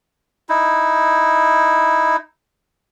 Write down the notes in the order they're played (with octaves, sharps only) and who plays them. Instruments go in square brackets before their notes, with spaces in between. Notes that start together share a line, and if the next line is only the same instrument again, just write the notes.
[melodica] D#4 E4